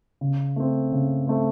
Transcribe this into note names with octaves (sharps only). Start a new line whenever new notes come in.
C#3
A3 C4
C#3
A3 C4